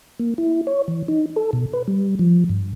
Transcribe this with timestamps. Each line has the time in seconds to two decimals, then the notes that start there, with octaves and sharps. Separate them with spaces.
0.20 A#3
0.38 E4
0.67 C#5
0.88 E3
1.08 D#4
1.36 A4
1.53 B2
1.73 B4
1.88 G3
2.19 F3
2.49 G2